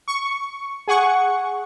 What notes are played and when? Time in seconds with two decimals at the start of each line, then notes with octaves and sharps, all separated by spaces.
0.08 C#6
0.87 G#4 F#5 C#6